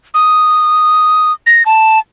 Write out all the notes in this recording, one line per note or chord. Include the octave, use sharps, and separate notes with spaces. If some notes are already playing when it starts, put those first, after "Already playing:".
D#6
A#6
A5